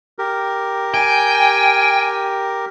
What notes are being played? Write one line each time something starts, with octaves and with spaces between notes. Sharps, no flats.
G4 A#4
G5 G#5